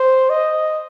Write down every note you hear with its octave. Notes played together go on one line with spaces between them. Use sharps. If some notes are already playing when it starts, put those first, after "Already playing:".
Already playing: C5
D#5